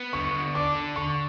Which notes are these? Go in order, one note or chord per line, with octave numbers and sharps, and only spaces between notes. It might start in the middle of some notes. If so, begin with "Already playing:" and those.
Already playing: B3
D3 C#6
D3
D4 D6
D3
D3 C#6